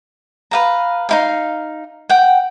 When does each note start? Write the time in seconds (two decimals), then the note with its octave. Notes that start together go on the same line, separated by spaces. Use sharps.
0.51 B4 F5 A#5
1.09 D#4 E4 F5
2.09 F#5 G5